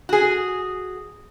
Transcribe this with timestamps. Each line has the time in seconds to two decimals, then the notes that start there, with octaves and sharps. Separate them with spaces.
0.09 F#4 G#4